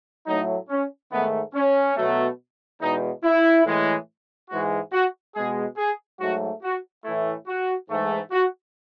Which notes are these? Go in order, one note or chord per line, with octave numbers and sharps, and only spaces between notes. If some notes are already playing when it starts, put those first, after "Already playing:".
A2 F#3 A3 D#4
C#4
G#2 D#3 A3 B3
C#4
B2 F#3 A3
E2 B2 G#3 D#4
E4
A2 E3 G#3
G#2 E3 G#3 F#4
F#4
B2 G#3 G#4
G#4
G#2 F#3 A3 F#4
F#4
A2 E3 A3 E4
F#4
G#2 E3 A3
F#4